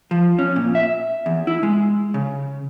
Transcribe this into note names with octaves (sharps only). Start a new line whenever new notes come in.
F3
C#4
A#2
E5
E2
E4
G#3
C#3